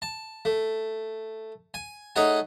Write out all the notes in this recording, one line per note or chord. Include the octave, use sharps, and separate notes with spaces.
A5
A3
G#5
A3 D#4 G#4 C#5 F#5 G#5